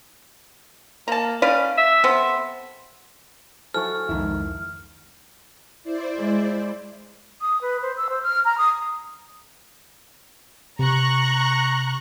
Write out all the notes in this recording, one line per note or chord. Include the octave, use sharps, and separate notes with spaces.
A#3 A5 A#5
C#4 B4 D5 F5
E5
B3 C4 A4
F#3 E4 A4 C5 G#5 C#6 F6
C2 F2 G#2 D#3 E4
E4 C5 D5
G#3
D#6
B4
C5
E6
C5
F6
A#5
D#6
C3 A#5 C#6 F#6